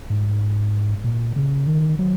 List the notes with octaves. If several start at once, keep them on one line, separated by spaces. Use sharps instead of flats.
G#2
A#2
C#3
D#3
F#3